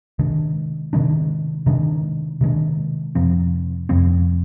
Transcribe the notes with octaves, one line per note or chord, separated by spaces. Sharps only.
C3 D#3 G#3 D4
C3 D#3 G#3 D4
C3 D#3 G#3 D4
C3 D#3 G#3 D4
F2 C3 F3 C4
F2 C3 F3 C4